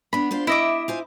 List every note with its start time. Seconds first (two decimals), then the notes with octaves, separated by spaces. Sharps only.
0.13 B3 D4 B5
0.31 D4 F4 C5
0.47 E4 D#5 E5 D6
0.88 F4 C5 G#5